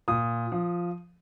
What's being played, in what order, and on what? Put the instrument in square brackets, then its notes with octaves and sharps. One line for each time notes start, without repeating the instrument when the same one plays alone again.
[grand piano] A#2 D#6
F3